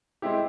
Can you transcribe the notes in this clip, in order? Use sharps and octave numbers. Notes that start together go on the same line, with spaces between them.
G#3 C4 E4 G4